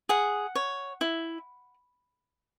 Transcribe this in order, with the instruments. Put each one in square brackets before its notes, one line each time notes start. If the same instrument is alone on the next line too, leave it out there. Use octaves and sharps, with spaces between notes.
[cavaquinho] G#4 F#5
C#5
E4